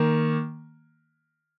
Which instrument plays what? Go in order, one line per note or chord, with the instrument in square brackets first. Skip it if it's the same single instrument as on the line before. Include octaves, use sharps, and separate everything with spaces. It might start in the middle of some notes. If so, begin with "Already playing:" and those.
Already playing: [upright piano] D#3 A#3